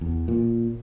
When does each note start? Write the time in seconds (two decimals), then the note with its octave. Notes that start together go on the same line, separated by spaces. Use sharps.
0.01 E2
0.28 A#2